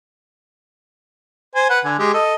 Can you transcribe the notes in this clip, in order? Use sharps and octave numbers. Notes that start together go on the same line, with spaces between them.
C5 G#5
B4 F#5
D3 G#5
G#3 G4
A4 D#5